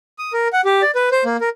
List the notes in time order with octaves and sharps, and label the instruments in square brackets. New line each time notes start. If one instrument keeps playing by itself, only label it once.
[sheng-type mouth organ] D#6
A#4
F#5
G4
D5
B4
C5
A#3
A#4